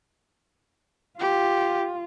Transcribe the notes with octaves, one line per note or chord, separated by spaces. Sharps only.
F4 G4